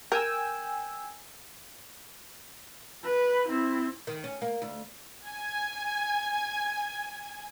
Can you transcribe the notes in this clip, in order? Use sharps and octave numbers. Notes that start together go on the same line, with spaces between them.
A#4 G5 G#5 E6
B4
C4 E4
D#3
C#4
A#3
D2
G#5 G#6